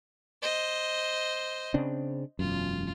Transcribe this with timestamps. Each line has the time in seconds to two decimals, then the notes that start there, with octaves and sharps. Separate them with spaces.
0.42 C5 D#5
1.74 C#3 C4 D4
2.39 E1 F#2 F4